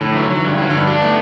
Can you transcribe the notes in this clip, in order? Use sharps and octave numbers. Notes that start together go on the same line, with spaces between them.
A2 D3
E3 F#3
D3
F#3
E3
G2 D3
E3 F#3
G2 D3
F#3 D4
A3 B3